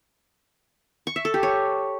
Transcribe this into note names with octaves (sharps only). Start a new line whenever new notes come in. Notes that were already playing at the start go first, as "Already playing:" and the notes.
C#6
E5
A4
G4
C#5